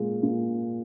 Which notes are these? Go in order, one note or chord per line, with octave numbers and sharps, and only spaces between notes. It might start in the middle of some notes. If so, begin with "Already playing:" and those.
Already playing: A#2 G#3
A#2